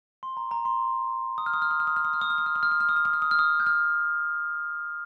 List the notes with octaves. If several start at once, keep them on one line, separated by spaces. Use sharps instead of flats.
C6
A#5
A#5
C6
D#6
F6
D#6
F6
D#6
F6
D#6
F6
D#6
F6
D#6
F6
D#6
F6
D#6
F6
D#6
F6
D#6
F6
D#6
F6
D#6
F6
D#6
G6
F6